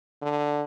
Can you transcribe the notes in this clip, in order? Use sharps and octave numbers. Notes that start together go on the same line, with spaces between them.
D3